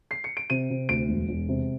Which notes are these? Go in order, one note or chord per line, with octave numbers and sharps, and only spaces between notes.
C7
C#7
D7
C3 D#7
C3
D2 D7
E1
E1
C3